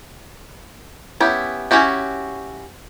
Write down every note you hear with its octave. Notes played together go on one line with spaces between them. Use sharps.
B3 C#4 E4 G4
C#4 E4 F#4 G4